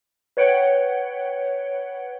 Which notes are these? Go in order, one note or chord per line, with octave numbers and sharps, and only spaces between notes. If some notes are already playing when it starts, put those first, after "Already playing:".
B4 C#5 F#5 G5